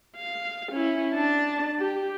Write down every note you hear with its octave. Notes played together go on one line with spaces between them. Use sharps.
F5
C#4 E4
D4 A5
G4